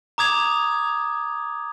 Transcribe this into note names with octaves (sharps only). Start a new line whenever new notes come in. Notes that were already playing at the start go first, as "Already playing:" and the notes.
A#5 D6 D#6 G#6 F7